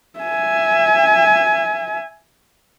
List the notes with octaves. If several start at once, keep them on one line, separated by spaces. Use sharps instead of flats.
E5 G#5